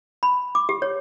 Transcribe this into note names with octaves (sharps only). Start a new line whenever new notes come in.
B5
D6
G4
C#5